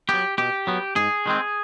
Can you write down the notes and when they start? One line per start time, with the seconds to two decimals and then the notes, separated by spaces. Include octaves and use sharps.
0.09 F#3 B3 G4
0.38 B2 G4
0.67 F#3 B3
0.96 G#2 G#4
1.26 D#3 G#3 C4